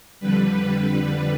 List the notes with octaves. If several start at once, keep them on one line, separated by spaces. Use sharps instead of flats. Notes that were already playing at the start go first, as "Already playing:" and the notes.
F2 D3 G3 B4